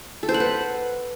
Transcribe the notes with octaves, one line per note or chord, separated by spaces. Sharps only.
A4
C5
F#5
B4